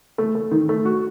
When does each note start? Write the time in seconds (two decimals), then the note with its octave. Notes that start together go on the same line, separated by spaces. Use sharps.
0.18 A3
0.35 A3
0.52 D#3
0.69 A3
0.85 F#4